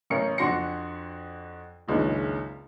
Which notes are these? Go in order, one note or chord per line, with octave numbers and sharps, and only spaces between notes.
A1 C#4 A#4 C#7
F2 D4 F#4 C6 A#6 C#7
F#1 C#2 D#3 C#4 D4